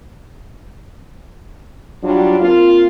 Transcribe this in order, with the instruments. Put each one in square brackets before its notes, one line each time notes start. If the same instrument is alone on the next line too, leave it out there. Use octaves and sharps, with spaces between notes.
[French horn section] F#3 G3 D4 F4
A#3 C4 F4